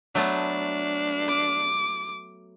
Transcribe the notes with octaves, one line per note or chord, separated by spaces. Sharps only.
F#3 A3 B3 D4
D6